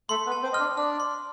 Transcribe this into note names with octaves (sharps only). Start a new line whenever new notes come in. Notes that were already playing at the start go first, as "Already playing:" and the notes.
A3 A4 C6
B3 B4
A5
C4 C5
D#5 F6
D4 D5
D4 D5 F6
C6